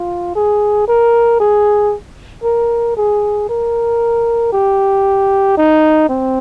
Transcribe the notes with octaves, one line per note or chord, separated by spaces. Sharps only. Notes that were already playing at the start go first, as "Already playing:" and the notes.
Already playing: F4
G#4
A#4
G#4
A#4
G#4
A#4
G4
D#4
C4